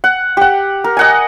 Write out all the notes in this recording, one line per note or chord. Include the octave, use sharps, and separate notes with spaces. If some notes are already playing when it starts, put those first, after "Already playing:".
F#5
G4 F#5
A#4
D#5 F#5 G#5